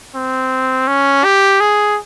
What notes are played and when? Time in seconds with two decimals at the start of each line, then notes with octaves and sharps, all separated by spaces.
0.15 C4
0.88 C#4
1.24 G4
1.60 G#4